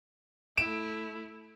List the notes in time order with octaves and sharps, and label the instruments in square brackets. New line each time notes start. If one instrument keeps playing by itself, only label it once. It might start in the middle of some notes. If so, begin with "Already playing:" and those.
[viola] A3 E4 [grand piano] D7 E7